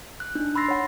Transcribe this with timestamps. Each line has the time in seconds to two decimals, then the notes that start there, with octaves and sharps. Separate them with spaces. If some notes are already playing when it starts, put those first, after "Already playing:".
0.20 F#6
0.35 D4 D#4
0.55 B5 C6 E6 A6 A#6 C7
0.68 C#5 F#5 B5